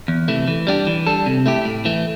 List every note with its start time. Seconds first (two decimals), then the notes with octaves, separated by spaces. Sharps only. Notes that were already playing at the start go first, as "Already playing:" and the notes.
0.08 E2
0.28 C3 E3 A3
0.48 E3
0.67 G3 D4 G4
0.87 E3
1.07 G3 D4 A4
1.26 C3
1.46 A3 E4 G4
1.65 A2
1.85 E3 A3